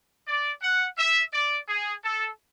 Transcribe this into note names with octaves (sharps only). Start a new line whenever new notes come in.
D5
F#5
E5
D5
G#4
A4